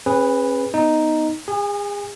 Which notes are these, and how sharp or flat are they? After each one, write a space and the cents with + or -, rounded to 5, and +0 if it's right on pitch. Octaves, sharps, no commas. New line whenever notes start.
C#4 -40 G#4 -10 B4 +0
B3 +0 D#4 +0
G#4 -35 G#5 +0